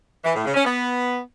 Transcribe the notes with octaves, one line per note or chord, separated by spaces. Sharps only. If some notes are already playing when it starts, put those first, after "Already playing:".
E3
A2
C#3
C#4
B3